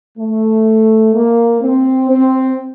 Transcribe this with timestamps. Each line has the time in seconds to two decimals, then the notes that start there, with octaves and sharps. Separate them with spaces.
0.18 A3
1.15 A#3
1.62 C4
2.10 C4